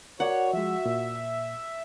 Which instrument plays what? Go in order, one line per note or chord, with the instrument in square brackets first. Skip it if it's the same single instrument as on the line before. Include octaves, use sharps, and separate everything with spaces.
[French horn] F#4 [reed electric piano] A#4 D5 [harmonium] C#5 [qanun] F#5
[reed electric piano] F3 G#3 [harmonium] E5
[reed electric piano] A#2